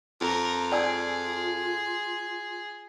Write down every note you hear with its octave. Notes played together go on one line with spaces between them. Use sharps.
F2 A#4 A#5
F4 G#4 D5 G#5 E6